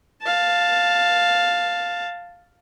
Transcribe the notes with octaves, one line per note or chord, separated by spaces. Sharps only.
F5 A5